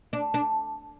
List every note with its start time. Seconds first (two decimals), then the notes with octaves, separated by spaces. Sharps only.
0.13 D4
0.34 D4